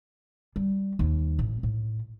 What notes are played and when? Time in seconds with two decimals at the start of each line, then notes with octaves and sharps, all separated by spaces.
0.56 G3
0.99 D#2
1.39 A1
1.63 A2